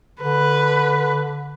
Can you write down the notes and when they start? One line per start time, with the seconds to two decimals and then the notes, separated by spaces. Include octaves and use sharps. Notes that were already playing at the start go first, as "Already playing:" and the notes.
0.22 D3 B4